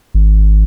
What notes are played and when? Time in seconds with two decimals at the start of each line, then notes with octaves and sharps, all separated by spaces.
0.14 G#1